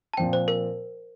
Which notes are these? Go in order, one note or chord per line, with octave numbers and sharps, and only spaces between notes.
A5
A#2 F3 C4 G5
C5
A#4